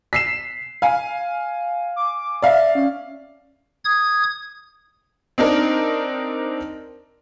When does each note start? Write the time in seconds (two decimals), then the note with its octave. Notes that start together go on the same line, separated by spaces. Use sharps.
0.13 B6 C7 E7
0.82 F5 G#5
1.96 D6
2.42 D5 E5 F5
2.75 C#4
3.85 D#6 G#6
5.38 C4 D4 D#4 A#4